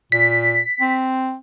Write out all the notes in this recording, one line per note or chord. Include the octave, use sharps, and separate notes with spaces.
A#2 B6
C4